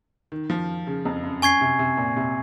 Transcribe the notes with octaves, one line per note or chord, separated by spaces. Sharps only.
D#3
F3
C#3
F2
F#2
F#2 G#5 C#6 G#6 C7
C3
C3
A#2
C3